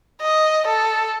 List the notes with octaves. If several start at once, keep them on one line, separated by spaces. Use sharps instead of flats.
D#5
A4